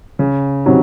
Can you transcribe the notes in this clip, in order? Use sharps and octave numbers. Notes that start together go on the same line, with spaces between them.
C#3
C3 D#3 F#3